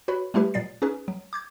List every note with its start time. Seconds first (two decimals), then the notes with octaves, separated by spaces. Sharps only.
0.08 F#4 B4 C#5 B5
0.34 G3 A3 E4 G4 B4
0.54 A#2 F#3 D5 A6 C7
0.82 C#4 D#4 G#4 B4
1.08 F#3
1.33 D6 G6 G#6